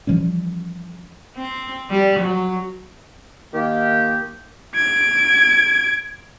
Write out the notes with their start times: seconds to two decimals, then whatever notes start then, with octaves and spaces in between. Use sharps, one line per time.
0.07 E3 F3 G3 C#4
1.36 C4
1.90 G3
2.19 F#3
3.54 D#3 A#3 G4
4.76 G#6 D7